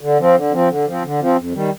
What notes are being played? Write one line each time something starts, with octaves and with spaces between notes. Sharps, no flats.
D3
F3 C4
D3
F3 C4
D3
F3 C4
D3
F3 C4
F2
D#3 G3